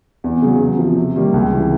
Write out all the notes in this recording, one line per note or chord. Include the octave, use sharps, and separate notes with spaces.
E2
C#3 F#3
E2
C3 F3
C3
D#3 G3 A#3
C#2
C3 E3